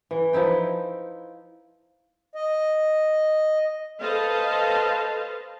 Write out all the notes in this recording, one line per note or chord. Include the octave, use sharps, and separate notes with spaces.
E3
F3 D#4 E4 G5
D#5
A4 B4 C5 D#5 F5 A5